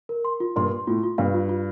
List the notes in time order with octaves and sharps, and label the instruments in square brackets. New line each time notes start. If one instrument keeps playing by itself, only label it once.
[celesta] A#4
C6
F4
[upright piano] G2 A#2 [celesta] C6
[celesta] C6
[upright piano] A2 [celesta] F4
[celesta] F4
[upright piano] G2 [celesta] F5
[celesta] F4
F4